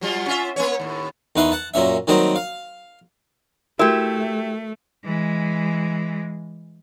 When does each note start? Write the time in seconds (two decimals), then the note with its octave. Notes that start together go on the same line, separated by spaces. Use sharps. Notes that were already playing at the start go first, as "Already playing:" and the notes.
0.01 F#3 G3 F4
0.26 C#4 F4 E5
0.56 A#3 C#4 C#5
0.80 D#2 A2
1.36 E2 D#3 B4 E5 C6
1.52 F#5 A5
1.74 F#2 A#2 C#4 E5
2.07 D#3 F#3 G3 A#3 C4 D#5
2.36 F5
3.79 A3 E4 F#4 G4 A#4 E5
5.04 E3 G#3